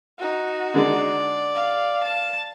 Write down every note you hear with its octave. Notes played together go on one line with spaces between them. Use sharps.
D#4 F#4
D3 G#3 D5
F5
A5